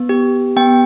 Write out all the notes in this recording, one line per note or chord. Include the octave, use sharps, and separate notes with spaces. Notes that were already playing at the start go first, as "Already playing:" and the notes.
Already playing: B3
G4
B3 G5